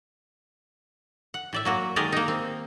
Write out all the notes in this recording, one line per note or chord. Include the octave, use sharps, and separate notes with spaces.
F#5
A2 D5 E5
F#3 A#3 F#4
D#3 G#3 G4 G#4 A#4 D5
A#3 D#4
C4